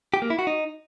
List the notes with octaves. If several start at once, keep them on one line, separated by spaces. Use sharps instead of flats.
G4
A#3
E4
F#4
D#4